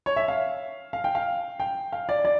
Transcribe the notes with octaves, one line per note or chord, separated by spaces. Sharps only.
C#5
E5
F5
F5
G5
F5
G5
F5
D5
D5